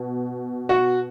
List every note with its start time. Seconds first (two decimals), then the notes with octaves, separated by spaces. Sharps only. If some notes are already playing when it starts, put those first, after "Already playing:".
Already playing: B2
0.69 F#4